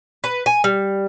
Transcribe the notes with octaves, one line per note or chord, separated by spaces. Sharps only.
B4
G#5
G3